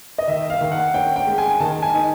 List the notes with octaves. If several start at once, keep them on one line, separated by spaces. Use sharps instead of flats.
D#5
D#3 E5
F5
D#3
F#5
C#4 G5
G5
G#3
G#5
D#3 A5
G#5
D#4